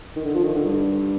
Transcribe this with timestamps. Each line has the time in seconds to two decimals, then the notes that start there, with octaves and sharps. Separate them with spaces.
0.16 D#3
0.24 D3
0.35 F3
0.44 D#3
0.55 D3
0.65 G2